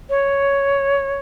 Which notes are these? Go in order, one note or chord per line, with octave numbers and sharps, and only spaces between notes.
C#5